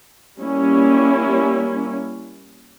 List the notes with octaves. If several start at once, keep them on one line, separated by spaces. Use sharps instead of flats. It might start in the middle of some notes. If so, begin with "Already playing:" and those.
G3 A#3 C#4 E4